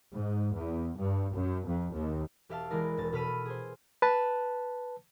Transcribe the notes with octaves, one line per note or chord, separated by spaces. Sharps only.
G#2
E2
G2
F#2
F2
D#2
E1 G4 E5 F5 A5
E3 G#3 E4 A#4 D5
E1 A6
B2 A4 B5 F6 B6 D#7
G#4 C5
B4 A5